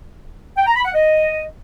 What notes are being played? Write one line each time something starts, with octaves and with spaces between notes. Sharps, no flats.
G5
A#5
B5
F#5
D#5